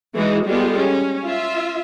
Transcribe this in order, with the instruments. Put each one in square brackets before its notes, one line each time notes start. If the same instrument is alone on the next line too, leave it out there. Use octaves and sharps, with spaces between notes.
[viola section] E3 G#3 D#4 F#4
G3 G#3 B3 F4 G4 A4
C#4
F4 E5